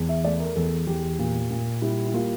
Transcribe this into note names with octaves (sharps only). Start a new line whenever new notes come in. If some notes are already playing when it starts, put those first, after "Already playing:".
Already playing: E2
E5
A3 D5
A#4
E2 A4
E2 G4
A#2
A#2
G3 E4
E4
A#3 F4